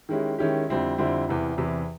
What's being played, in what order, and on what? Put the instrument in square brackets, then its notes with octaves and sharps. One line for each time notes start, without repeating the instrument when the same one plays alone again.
[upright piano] D#3 G#3 C#4 E4 G4
D#3 G#3 C#4 E4 G4
F2 D3 G3 C4 E4
F2 D3 G3 C4 E4
E2 C3 E3
E2 C3 E3